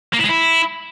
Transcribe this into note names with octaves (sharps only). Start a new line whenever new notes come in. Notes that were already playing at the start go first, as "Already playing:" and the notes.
A#3
E4
G#3
E4